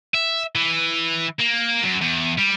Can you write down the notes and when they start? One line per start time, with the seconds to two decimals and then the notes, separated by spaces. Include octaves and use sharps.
0.14 E5
0.55 E3
1.40 A#3
1.83 F#2
2.02 E2
2.38 G3